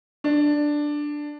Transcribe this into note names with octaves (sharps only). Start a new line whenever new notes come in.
D4